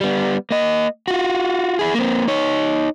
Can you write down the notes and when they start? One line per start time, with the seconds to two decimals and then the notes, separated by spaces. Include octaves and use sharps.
0.01 G3 B3
0.51 A#3 D#5
1.08 F4 F#4
1.79 E4 G#4
1.94 A#3 C4
2.28 D#4 C#5